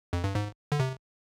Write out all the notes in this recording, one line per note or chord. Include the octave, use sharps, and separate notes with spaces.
F2
G2
G#2
D3
C3